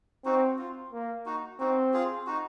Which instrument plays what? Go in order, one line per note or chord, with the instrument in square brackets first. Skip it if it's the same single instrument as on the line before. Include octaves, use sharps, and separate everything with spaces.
[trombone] C4 [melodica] D#4 F#4
[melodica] F4
[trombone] A#3
[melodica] D#4 F#4
[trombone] C4 [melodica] D#4 F#4
[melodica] F4 G#4
D#4 F#4